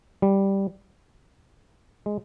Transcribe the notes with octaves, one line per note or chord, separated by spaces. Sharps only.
G3
G#3